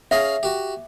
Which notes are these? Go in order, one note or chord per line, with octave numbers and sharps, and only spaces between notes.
C#4 G#4 E5 F5
F#4 G4